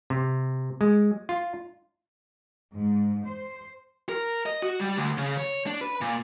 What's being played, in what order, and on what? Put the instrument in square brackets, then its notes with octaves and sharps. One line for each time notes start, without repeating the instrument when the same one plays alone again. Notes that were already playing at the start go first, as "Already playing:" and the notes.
[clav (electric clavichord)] C3
G#3
F4
[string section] G#2
C5
[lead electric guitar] A#4
D#5
F#4
G3
D2
C#3
C#5
D4
B4
A#2